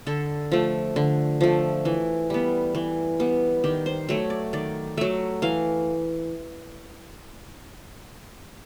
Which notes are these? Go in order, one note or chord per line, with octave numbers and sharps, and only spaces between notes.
D3 A4
F3 A3
D3
F3 A3
E3
G3 B3
E3
G3 B3
D#3 G4
C5
F#3 A3 C#5
D5
D#3 D5
F#3 A3 E5
E3 F5